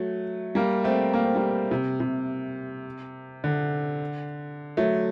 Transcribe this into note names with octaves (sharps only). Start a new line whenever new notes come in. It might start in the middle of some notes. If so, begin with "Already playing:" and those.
Already playing: F#3 A3
G3 A#3
A3 C4
A#3
C4
G3 A#3
C3
C3
D3
F#3 A3